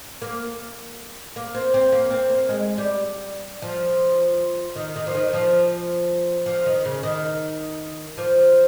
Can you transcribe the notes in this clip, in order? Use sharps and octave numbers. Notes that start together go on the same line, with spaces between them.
A#3
A#3
C4
C4
A#3
C4
A#3
G#3
G3
F3
D#3
D#3
F3
D#3
F3
F3
D#3
C#3
D#3
F3